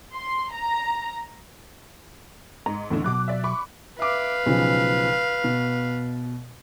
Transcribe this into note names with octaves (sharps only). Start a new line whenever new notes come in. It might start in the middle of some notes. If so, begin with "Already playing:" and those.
C6
A#5
G#2 A#5
E2 A2 D3 B3
B2 F#3 D6 F#6
D5 E5
B5 C#6 D6
B4 E5 F5 D6
B1 C#3 F3
B2